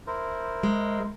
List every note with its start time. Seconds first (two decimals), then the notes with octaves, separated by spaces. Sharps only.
0.07 E4 A#4 C5
0.63 G#3